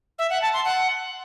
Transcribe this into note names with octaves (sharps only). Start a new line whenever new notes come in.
E5
F#5
A5
C6
F#5